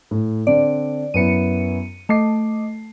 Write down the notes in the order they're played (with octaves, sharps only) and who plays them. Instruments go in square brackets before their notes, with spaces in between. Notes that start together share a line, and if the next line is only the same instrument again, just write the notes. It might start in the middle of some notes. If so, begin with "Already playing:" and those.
[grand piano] A2
[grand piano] D3 C4 D4 [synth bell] D5
[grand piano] F#2 B3 E4 [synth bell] C#7 D#7
[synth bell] A3 [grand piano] D#5 D6 C7